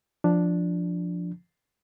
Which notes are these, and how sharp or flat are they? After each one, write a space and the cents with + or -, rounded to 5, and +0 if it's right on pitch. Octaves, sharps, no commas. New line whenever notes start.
F3 +0 D4 +0